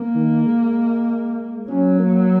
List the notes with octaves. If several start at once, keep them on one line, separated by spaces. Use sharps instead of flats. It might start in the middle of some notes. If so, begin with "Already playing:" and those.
Already playing: A#3
D#3
G#3
F#3 C#4
A#3